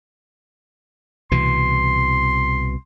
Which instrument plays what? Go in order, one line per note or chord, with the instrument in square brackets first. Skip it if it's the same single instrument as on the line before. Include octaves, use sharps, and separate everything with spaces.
[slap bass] C2 B2 E3 [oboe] C6